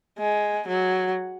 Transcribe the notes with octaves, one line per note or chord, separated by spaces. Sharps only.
G#3
F#3